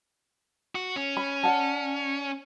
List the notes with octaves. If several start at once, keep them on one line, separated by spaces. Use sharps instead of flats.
F#4
C#4
B5
D5 F#5 A5